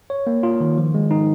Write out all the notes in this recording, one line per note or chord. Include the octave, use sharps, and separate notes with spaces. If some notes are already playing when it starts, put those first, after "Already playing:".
C#5
A#3
F4
D#3
F3
G#3
D#4